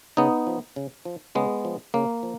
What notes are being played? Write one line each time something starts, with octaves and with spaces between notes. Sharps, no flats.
C#3 B3 D#4
F3
C#3
F3
C#3 G#3 B3
F3
C#3 A#3
F3